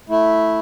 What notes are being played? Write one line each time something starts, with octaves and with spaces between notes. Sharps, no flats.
A3 E4